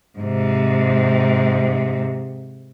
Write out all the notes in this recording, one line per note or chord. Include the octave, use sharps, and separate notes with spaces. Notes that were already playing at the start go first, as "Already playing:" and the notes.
G#2 C3